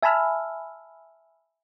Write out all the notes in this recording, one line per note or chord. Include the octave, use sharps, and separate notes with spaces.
E5 G#5 A5 B5 E6 F6